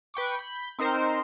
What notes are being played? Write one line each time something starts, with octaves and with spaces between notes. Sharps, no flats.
B4 G5 C#6 D6
B5 G6
C4 D#4 A#4 C5